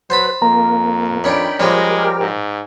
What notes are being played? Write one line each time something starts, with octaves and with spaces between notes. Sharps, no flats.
F#3 B4 C5 A5 B5
F2 A#3 A#5
D#3 C#4 D4 G5 B5
F3 G3 G#3 C#4 G4 A#4
G#2